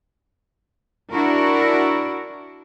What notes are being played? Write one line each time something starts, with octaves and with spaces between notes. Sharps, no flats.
D4 E4 F#4 A#4